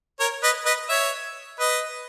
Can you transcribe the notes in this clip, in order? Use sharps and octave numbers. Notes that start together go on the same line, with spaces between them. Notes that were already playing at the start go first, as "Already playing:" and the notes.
A#4 C#5
B4 D#5
B4 D#5
C#5 E5
B4 D#5